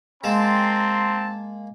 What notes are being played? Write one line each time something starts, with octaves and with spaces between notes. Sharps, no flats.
G#3 A#3 C4 G5 A5 A#5 C6